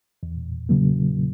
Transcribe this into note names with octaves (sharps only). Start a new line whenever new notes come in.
E2
C#3 F#3 A#3